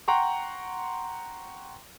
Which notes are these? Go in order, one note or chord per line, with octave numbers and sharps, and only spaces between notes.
F#5 G5 A#5 C6 C#6